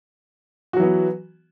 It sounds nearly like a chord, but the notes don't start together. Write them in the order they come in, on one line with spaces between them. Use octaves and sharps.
F#4 F#3 E3 B3